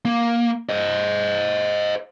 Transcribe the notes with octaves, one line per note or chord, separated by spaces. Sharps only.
A#3
C5 D#5